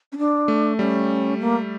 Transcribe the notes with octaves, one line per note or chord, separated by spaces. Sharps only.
C#4
D4
A3
G3 C#4
A#3